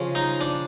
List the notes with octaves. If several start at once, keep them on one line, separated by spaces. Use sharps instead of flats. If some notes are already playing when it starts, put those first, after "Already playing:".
Already playing: C#3 F3
D#4
D4